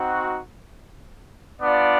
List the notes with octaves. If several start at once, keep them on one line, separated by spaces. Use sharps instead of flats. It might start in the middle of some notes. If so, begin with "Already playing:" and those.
Already playing: C4 D#4 F#4
B3 D4 F4 D5